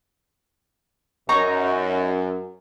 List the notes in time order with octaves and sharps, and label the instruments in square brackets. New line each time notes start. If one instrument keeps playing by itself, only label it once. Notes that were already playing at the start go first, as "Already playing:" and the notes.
[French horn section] F#2 [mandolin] D#4 C#5 A#5